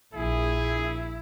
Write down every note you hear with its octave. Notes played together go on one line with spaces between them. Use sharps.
A#1 E4 G#4